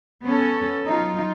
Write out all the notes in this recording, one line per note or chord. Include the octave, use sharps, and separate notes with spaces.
B3 C#4 A4
F#3 D#4 F4